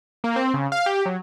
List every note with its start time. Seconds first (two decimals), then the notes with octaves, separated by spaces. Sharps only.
0.24 A#3
0.36 C4
0.54 C#3
0.72 F5
0.86 G4
1.06 F#3